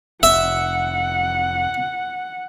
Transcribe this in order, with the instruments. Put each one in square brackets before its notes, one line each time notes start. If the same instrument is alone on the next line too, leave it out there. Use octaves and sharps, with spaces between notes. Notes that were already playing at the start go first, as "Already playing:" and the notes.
[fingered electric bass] F1 [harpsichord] E5 [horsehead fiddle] F#5